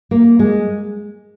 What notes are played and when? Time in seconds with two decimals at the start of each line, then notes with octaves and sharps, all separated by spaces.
0.11 A#3
0.39 G#3